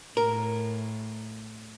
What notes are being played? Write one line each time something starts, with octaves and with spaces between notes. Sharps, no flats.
A2 A#4